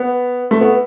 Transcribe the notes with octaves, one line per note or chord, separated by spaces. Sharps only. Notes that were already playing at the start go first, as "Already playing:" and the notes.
Already playing: B3
A3
B3